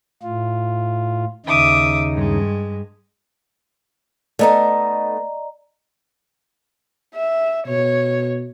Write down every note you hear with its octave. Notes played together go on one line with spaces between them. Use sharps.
A2 F4
D#2 C#3 D#4 E5 D6 D#6
G2 G#3
A3 B3 D#4 D5 D#5 A#5
E5
B2 C#5